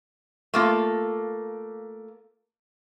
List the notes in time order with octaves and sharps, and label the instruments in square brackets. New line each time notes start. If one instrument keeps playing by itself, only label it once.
[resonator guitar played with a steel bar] A3 A#3 F4